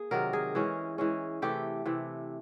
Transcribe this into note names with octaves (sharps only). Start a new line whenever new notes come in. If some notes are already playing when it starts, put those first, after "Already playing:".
Already playing: A#3 G#4
C3 D#3 F#3 A#4
G#4
E3 G#3 C#4
E3 G#3 C#4
C3 E3 A3 G4
C3 E3 A3